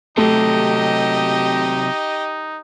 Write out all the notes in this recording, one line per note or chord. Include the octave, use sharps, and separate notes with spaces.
C3 F#3 A3 D#4 G4 D#5